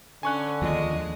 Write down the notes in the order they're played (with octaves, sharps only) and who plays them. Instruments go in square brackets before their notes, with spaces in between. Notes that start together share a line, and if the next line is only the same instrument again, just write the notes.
[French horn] D3 [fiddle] C#4 [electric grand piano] G#5 C#6 F#6
[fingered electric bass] D#2 F3 [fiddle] G#3 D#5